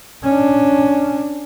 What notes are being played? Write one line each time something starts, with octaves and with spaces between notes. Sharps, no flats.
C#4 D4